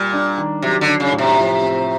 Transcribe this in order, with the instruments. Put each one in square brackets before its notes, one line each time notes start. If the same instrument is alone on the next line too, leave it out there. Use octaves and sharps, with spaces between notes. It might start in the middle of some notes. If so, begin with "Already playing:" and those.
Already playing: [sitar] A#2 [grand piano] G3
[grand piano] D4
D#3
[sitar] C3 [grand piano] F#3
[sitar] D3
[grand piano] D4
[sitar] C#3
[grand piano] A2
[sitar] C3
[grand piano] F3
C4